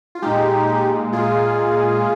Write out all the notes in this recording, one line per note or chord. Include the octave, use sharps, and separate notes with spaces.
F4
A#2 G#3 D#4 G4
A#2 G#3 F4 G#4